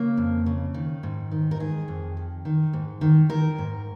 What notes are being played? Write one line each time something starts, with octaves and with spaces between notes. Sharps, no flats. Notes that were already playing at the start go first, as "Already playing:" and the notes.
Already playing: C#3 A#3
F2
C#3
D#3
G#2
D#3
A#4
D#3 G#4
F2
D#3
D#3
G#2
D#3
D#3 A#4
G#2